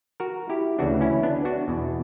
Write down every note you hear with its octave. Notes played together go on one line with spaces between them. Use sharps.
F#4 A#4
E4 G4
D2 C#3 E3 D4 F#4
C#4 E4
B3 D4
D4 F#4
E2 B2